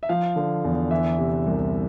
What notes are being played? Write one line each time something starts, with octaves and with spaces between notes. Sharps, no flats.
E5
F3 F5
D3
E2
E3 E5
C3
C2